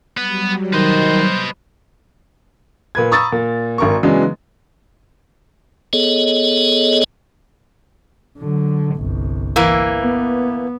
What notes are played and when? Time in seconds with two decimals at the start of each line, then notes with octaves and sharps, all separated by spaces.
0.17 F#3 G3 B3
0.73 D#3 B4 C5 D#5
2.95 A#2 B4 G#6
3.11 A#5 B5 C#6 D#6 E6 A6
3.32 A#2
3.78 G#1 A#4 C#6
4.03 C#3 E3 F#3 G#3 B3 D4
5.93 B3 G#4 A4 C#5 D#5
8.38 D3 F#3
8.96 G1 C2
9.56 E3 A#3
10.00 B3